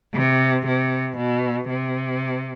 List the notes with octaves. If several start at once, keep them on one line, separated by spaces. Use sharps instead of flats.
C3
C3
B2
C3